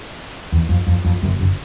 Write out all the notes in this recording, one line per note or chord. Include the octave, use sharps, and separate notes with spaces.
E2
F2
F2
F2
F#1 F#2
F#1